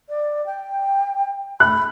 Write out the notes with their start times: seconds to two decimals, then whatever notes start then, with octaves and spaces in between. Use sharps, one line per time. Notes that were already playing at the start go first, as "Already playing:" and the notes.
0.09 D5
0.46 G5
1.60 B5 F#6